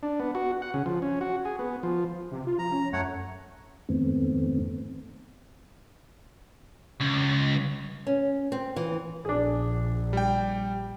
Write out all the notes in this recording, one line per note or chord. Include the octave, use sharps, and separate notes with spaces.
D4
B3
F#4
F#5
C#3
F3
C#4
F#4
G#4
B3
F3
C3
F4
F3 A#5
C#4
F#2 A3 C#5 F#5
F2 G#2 D#3 A3 B3 C4
C#2
C#4
C4
E3
A#1 D4 G#4
G3 G5